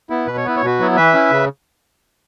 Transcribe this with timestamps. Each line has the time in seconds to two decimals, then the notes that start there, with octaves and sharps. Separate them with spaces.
0.10 B3 E4
0.27 B2 B4
0.37 C#5
0.44 B3 E4 B4
0.56 C#5
0.62 B2 F#4 B4
0.80 F#3 B3 E4
0.96 E3 B4 E5
1.14 C#4 E4
1.31 C#3